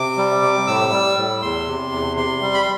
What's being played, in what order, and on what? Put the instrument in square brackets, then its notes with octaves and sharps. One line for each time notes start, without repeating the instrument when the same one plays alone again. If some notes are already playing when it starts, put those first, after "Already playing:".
Already playing: [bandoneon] C3 D6
G3
C3
A2 E6
G3
A2
E2 C6
C3
E2
C3 C6
G3
B5
C6